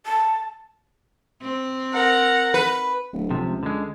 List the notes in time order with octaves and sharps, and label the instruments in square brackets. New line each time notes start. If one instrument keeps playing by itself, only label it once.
[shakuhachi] A5
[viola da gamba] C4
[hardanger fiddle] A#4 F#5
[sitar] B4
[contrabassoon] D1
[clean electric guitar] C3 F3
[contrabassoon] C#2
[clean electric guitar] D3 G#3